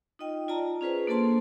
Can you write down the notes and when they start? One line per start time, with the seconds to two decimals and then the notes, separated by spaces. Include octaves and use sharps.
0.19 D#4 F4 D#5 G5
0.48 F4 D5 A5 A#5
0.81 C#4 F4 G#4 B4 C5
1.07 A#3 D4 A4 C5 A5 C6